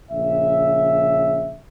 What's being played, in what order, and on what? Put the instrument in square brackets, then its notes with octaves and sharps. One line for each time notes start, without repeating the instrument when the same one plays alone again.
[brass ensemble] A#1 C#3 E5